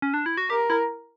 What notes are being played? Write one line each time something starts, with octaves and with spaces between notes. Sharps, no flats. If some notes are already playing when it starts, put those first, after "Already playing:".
C#4
D4
E4
F#4
G4 A#4
E4